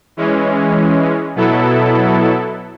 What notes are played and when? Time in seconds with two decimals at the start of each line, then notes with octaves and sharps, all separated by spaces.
0.17 E3 G#3 C#4
1.35 B2 F#3 B3 E4 A4